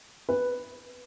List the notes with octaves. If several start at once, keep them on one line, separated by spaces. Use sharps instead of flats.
B4